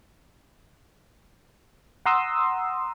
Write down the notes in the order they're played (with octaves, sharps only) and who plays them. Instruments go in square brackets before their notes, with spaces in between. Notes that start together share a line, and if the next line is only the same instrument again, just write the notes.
[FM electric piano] F#5 A#5 C6 D#6 E6